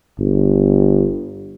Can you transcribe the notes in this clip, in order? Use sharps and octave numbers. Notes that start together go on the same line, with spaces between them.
G1